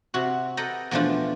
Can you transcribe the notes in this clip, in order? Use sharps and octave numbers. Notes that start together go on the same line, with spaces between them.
C3 F#4
A4 B4 D#5 F#5 G5 A#5
E2 B2 F3 A3 D4 F4